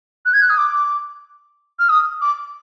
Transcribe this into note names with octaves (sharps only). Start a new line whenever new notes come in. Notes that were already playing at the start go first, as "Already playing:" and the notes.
F#6
G#6
F#6
D#6
D6
F6
D#6
D6